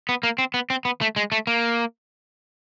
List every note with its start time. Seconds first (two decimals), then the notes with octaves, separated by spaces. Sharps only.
0.09 B3
0.23 A#3
0.38 C4
0.54 B3
0.70 C4
0.85 B3
1.01 A3
1.16 G#3
1.32 A3
1.47 A#3